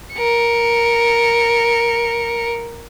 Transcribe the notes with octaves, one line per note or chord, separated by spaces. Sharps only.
A#4 C#7